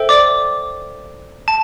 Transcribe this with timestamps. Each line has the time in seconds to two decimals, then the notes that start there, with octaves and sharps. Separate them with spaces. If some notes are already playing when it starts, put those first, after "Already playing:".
Already playing: A4 C5 E5 G5
0.09 D5 D6
1.48 A5